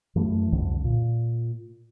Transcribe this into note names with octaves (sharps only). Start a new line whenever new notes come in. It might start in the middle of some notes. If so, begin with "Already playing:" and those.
F#2 E3 A3
C2 F2 D3
A#2